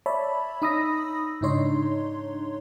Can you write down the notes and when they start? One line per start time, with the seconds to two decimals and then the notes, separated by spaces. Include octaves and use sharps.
0.06 C#5 D5 E5 A5 B5
0.62 D#4 B5 D#6 E6 A#6
1.41 G#2 C#3 D4 D#4 C#5 C6